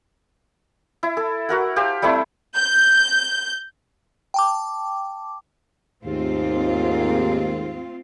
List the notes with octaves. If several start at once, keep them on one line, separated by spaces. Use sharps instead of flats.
E4
A4
F#4 A#4 F#5
G4 C5 F5 A5
G3 A3 C4 E4
G6
G5 A5 D6
D#2 G#2 A3 C4 F4